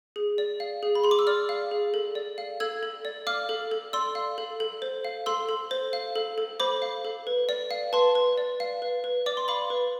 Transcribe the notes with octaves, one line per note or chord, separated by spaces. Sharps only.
G#4
D5
F5
G#4
B5
G#4 C6
D6
E6
D5 D6 F6
F5
G#4
A4
D5
F5
A4 E6 G#6
A4
D5
F5 D6 F6
A4
A4
D5 C6 E6
F5
A4
A4
C5
F5
A4 C6 E6
A4
C5
F5
A4
A4
C5 B5 D6
F5
A4
B4
D5
F5
B4 A5 C6
B4
D5
F5
B4
B4
D5 D6
C6
F5 B5 D6
B4